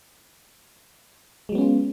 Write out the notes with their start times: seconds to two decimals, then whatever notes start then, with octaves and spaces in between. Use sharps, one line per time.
1.49 G#3
1.52 F#3
1.55 B3
1.58 C#4
1.61 F4